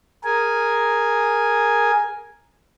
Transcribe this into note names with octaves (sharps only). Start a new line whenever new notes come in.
G#4 A#4 G#5